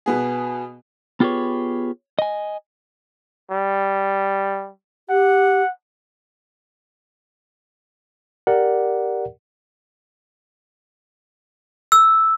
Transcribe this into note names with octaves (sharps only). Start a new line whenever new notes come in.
B2 B3 G#4
B3 F4 G4 G#4 B4 C#5
D#5 G#5
G3
G4 F#5
G4 A#4 D5 F#5
E6